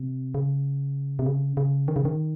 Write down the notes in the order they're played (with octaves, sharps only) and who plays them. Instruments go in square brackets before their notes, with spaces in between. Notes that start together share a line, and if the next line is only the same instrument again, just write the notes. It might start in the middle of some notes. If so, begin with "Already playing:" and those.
Already playing: [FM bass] C3
C#3
C3
C#3
C#3
D#3
C#3
D#3